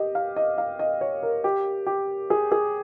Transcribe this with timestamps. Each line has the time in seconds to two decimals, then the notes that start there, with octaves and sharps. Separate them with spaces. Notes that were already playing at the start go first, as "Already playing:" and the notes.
Already playing: G4 D#5
0.15 F5
0.36 D#5
0.58 F5
0.79 D#5
1.01 C#5
1.23 A#4
1.44 G4
1.87 G4
2.30 G#4
2.52 G#4